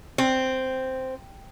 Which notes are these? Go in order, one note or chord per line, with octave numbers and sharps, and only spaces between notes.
C4